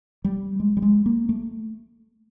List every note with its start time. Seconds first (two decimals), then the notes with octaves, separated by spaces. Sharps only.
0.24 G3
0.60 G#3
0.77 G3
0.82 G#3
1.06 A#3
1.29 A3